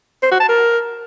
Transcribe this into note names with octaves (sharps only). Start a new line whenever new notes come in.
C5
F#4
A5
A#4